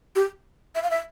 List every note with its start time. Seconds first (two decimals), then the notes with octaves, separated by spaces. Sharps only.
0.16 G4
0.75 E5
0.83 F5
0.91 E5